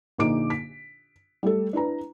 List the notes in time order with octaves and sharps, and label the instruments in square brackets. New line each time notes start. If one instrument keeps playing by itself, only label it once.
[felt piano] A#1 D3 A#3 D#4 D6 D7
B6
G3 A3 A4
D4 E4 B4 A#5